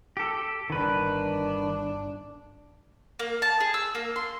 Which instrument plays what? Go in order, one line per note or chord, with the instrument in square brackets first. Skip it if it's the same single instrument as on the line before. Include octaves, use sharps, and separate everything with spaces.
[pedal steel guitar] G4 A4
[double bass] G1 D4 [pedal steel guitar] D#3 B4
[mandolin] A#3
A5
G#4
E6
A#3
C6